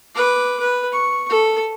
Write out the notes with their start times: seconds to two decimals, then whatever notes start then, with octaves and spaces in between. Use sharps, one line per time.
0.15 B4 D6
0.60 B4
0.91 C#6
1.30 A4